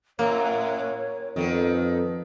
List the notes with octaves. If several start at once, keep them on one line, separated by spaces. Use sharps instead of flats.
F#2 A2 A#3 C#5
F2 D#3 B3 A4